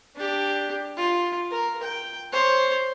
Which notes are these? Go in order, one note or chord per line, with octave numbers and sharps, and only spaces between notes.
D4 G4
F4
A#4
G5
C5 C#5